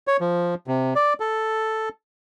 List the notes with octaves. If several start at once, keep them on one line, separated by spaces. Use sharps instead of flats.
C#5
F3
C3
D5
A4